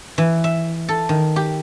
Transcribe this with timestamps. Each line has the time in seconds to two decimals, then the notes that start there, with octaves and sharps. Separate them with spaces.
0.18 E3
0.44 E5
0.89 A4
1.09 D#3
1.36 G4